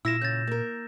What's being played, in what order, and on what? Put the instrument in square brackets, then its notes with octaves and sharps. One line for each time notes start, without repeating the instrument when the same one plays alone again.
[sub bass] A#2 [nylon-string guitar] E4 F4 [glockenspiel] E6 A#6 E7
[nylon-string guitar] C#3 [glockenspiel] G6 A6
[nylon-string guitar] A#3 A#4